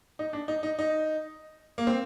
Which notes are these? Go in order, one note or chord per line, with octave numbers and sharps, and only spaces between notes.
D#4
D4
D#4
D#4
D#4
A#3
C4